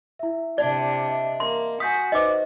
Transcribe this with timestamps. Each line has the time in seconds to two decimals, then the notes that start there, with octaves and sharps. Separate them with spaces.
0.19 E4 E5
0.58 C3 D4 D5
1.07 D#5 E5
1.40 A#3 C6
1.80 F#4 G#5 D#6 G6 B6
2.12 D#4 B4 C5 D#5 D6